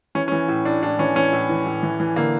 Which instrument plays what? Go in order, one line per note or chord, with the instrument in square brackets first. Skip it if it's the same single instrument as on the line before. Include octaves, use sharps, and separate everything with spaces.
[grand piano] E3 C#4
C#4
E3
A2
A2 D4
A2 D4
E3 C#4
E3 C#4
A2
E3
A2
E3
E3
D3 A#3